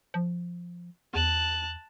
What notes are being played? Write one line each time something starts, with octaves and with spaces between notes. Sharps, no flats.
F3
E2 A5 F#6